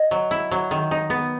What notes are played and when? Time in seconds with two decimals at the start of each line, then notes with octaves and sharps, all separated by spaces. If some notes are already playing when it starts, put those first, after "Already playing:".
Already playing: D#5
0.11 F#3
0.31 E4
0.51 F#3
0.71 D#3
0.91 D#4
1.10 B3